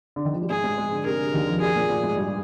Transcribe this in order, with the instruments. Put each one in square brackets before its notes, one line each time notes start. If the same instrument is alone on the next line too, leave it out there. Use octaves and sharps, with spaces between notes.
[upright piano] D3
D#3
F3
G3
[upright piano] G#2 G#3 [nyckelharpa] G#4
[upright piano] G#2 G#3
G#2 G#3
D3
[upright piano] C3 [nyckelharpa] A#4
[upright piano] D3
D#2 D#3
F2 F3
[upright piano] G2 G3 [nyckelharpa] G#4
[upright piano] A#2 A#3
A#2 A#3
G#2 G#3
G2 G3